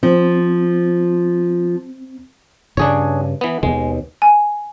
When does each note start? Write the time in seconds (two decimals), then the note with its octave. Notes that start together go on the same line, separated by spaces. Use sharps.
0.03 F3 C4
2.77 G2 C#3 D4 G#4 C#5
3.41 E3 B3
3.63 D#2 B2 G#3
4.22 G#5